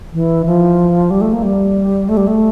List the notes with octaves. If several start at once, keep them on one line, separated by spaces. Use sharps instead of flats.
E3
F3
G3
A3
A#3
G3
A3
G3
A3